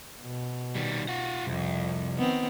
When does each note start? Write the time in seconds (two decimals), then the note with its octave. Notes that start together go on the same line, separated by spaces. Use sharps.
0.22 B2
0.75 D#3 G3
1.08 F4 F#5
1.46 C2 F2
2.17 D#3 B3 C4